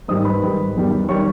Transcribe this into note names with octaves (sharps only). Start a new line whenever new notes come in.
G#2 D#3 G3 D#5 D#6
B4 B5
G#2 D#3 G3
E2 D#3 G3
D#3 G3 C#5 C#6